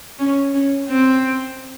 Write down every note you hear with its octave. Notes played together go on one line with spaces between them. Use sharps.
C#4
C#4
C4